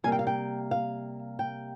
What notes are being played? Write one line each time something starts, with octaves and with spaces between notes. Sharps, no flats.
C3 G3 A#3 G#5
G5
F5
G5
F5
G5